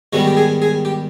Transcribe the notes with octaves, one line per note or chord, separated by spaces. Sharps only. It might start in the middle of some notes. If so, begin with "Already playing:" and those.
G#2 D#3 G3 B3 F#4
G4
G#4
G#4
G4